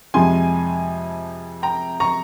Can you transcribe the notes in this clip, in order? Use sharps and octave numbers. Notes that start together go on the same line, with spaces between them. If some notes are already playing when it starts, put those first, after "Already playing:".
F2 C3 F3 G#3 G#5 C6
G5 A#5
A#5 C#6